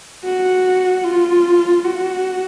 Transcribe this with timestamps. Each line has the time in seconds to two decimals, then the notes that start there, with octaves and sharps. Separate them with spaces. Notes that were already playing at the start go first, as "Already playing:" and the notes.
0.24 F#4
1.04 F4
1.84 F#4